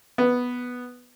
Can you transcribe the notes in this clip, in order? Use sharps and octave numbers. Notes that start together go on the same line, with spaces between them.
B3